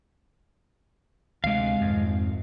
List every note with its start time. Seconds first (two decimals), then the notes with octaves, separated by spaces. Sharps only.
1.44 D2 C3 G#3 F5
1.81 G#1 F2